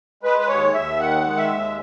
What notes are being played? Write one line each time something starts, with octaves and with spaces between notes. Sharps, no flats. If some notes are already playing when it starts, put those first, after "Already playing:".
G#3 B4
B4
D#2 C#5
D#2 E5
D#3 F#5
G#3
E5
D#2